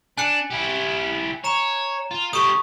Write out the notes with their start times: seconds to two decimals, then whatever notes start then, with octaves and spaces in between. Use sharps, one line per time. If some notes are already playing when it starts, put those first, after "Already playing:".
0.18 D4 G#5 F#6 C#7
0.50 E4 G4
1.44 C#5 A#5 E7
2.11 F4
2.33 A3 G4 C#6 D#6